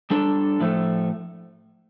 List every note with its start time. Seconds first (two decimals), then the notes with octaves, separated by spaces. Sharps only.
0.10 G3 D4 A4
0.60 A2 F3 A3